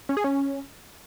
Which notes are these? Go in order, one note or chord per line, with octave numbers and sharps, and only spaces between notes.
C#4
G#4
C#4